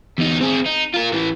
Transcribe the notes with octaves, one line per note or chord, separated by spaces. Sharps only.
E2 D#4
C4 G#4
D#4
F4 A#4
A2 E3